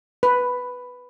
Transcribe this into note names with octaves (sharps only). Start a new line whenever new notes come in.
B4